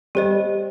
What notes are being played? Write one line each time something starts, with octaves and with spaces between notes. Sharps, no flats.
G3 G4 C5 D#5